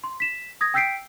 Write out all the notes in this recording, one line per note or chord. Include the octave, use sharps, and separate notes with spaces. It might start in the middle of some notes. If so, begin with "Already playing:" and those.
C6
B6 E7
D#6 G#6 A#6
G5 E6 G6 B6 C7 D7